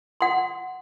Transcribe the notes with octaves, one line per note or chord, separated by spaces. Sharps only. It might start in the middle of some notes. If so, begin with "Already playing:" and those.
F#5 C6